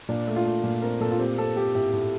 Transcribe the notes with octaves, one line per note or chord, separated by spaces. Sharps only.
A#2 D4
A3
F4
A3
A#2
C4 A#4
A#2 A4
F4
C4 G4
C4 A4
C4 G4
A2 G4
A2